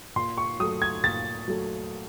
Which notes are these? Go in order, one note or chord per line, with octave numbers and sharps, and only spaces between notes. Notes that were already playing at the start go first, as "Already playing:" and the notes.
A#2 C6
C#6
F#3 A3 D#6
G#6
A#2 A6
F#3 A3